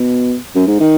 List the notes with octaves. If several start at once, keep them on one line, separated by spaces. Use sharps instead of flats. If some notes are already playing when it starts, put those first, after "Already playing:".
Already playing: B2
F#2
G#2
D#3